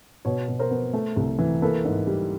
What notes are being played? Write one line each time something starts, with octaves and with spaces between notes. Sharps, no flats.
B2 B4 C#5
B2
A#4 C5
B3
A3
C2
E3
A#3 A4 B4
G#2
G3